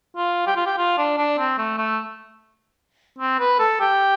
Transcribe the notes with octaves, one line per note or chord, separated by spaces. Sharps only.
F4
G4
F4
G4
F4
D4
D4
C4
A3
A3
C4
B4
A4
G4